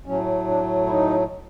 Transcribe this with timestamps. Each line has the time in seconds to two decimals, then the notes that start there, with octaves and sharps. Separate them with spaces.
0.06 A2 F#3 A3 C#4
0.47 D4
0.86 E4
0.90 D#4